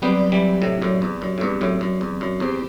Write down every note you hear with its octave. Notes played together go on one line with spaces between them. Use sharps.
F#3 G3 B3 C4 G4 D5
E3 G3
A2 C3
F#2 A2
E2
F#2
A2
E2 G2
F#2 A2
F#2
E2
F#2
E2 C4 G4 C5